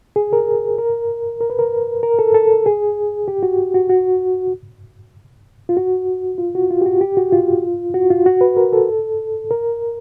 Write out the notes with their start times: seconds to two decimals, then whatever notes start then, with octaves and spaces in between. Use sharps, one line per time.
0.16 G#4
0.33 A#4
0.78 A#4
1.41 A#4
1.50 B4
1.59 A#4
2.03 A#4
2.19 A4
2.34 A4
2.66 G#4
3.28 G4
3.43 F#4
3.74 F#4
3.90 F#4
5.69 F4
5.77 F#4
6.38 F4
6.55 F#4
6.71 F4
6.81 G4
6.86 F#4
7.01 G4
7.17 F#4
7.32 F4
7.94 F#4
8.10 F4
8.26 F#4
8.41 B4
8.57 A#4
8.73 A4
9.51 A#4